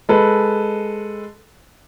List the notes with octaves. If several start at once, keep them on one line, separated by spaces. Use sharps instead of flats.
G#3 A4 B4